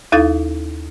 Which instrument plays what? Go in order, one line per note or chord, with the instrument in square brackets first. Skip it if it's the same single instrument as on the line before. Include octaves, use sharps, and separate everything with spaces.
[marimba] D#2 D#4 E4 A4 F5 A6